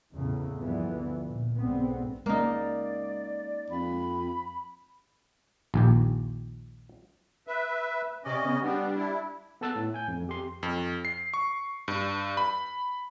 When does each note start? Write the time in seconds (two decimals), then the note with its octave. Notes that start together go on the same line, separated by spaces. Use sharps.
0.14 E2 A2 C#3
0.56 G1 D2 D3 E3 F3 B3
1.25 A#2
1.58 B1 G#2 D3 B3 C4
2.26 G#3 A#3 C#4 D#4 D5
3.70 F2 B5
5.74 A#1 D#2 G4
7.47 B4 E5
8.25 C3 C#4 D5 D#5
8.44 C#3 B3
8.61 G3 B3 D4
8.96 E4
9.61 B3 A4 A5 E6 F#6 A6
9.76 A2
9.94 G#5 G6
10.08 F2
10.27 F2 G4 C6
10.63 F2
11.05 C7
11.34 C#6
11.88 G2
12.37 B5